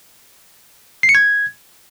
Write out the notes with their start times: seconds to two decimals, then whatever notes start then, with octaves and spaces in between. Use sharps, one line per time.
1.03 C7
1.09 C#7
1.15 G#6